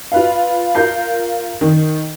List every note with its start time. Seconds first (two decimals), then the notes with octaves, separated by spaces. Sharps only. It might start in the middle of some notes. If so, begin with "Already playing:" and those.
0.12 F4 B4 F5
0.75 F4 A#4 G6 C7
1.61 D#3